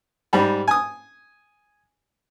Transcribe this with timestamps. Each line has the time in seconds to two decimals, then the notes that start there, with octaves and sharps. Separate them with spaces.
0.33 G#2 G3 B5
0.68 G#5 D#6